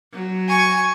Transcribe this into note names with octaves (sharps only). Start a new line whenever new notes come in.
F#3
G#5 C#6